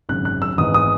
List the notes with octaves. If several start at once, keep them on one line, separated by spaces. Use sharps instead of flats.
G#1 F#2 C#3 F#6
F#6
E6
G#1 G#2 E3 B3 D#4 D#6
D#6